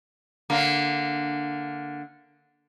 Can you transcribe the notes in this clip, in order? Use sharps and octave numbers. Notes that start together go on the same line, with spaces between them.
D3 A#3